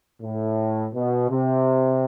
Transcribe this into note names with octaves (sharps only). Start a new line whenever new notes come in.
A2
B2
C3